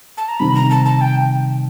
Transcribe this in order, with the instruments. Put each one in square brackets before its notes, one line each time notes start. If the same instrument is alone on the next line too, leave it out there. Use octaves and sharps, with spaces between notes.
[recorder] A5
A#5
[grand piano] C3 D#3 G3 C4 [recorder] B5
[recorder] A#5
A5
A5
G5